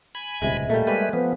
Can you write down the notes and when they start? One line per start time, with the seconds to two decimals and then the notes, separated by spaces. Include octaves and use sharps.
0.15 G#5 B5
0.42 D#1 C#2 C3 G#3 E5
0.70 A#2 G3 A3 A#3
0.87 G3 G#3 C#4 G4 B4
1.13 F3 B3 B4